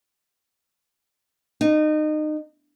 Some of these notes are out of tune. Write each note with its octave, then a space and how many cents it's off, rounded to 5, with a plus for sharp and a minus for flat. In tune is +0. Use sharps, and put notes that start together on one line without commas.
D#4 -25